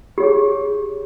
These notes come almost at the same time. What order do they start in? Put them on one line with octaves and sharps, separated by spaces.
G4 C#5 G#4